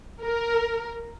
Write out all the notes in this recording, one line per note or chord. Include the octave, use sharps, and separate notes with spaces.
A#4